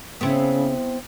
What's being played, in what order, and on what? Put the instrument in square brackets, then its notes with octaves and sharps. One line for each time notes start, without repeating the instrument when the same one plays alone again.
[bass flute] C#3 [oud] B3 C4 E4